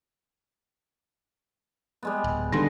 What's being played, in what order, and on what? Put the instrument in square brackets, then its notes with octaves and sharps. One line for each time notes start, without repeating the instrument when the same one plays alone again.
[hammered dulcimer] G3 G#3 B3
[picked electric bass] D1
[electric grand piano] D3 C6 A#6 [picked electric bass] D#3 G3 [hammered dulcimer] B3 B4